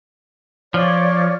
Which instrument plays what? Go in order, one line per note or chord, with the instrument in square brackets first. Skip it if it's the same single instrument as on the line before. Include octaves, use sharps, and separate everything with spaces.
[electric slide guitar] F3 [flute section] C#5 D5